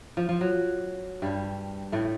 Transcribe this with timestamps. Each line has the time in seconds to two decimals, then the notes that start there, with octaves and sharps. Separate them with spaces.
0.17 F3
0.29 F3
0.41 F#3
1.22 G2 G3
1.92 A2 A3